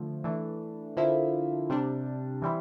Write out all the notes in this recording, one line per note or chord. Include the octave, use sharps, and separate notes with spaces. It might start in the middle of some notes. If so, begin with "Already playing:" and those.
Already playing: D3 F3 A3
E3 A3 D4
D3 F3 A#3 E4
C3 G3 D4
E3 G3 C4 E4